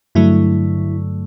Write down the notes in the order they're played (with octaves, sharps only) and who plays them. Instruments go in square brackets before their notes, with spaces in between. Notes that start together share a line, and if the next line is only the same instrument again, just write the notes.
[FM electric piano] G2 D3 F#3 A3 E4